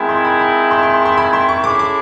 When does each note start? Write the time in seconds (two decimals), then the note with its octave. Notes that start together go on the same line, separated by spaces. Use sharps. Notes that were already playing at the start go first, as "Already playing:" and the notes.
Already playing: D#3 G#3 C4 E4
0.09 C6
0.25 B5
0.40 B5
0.71 C6
0.83 C6
0.94 C6
1.05 C6
1.17 B5
1.33 C6
1.49 C#6
1.64 G#3 C#4 E4 A4 D6
1.79 D6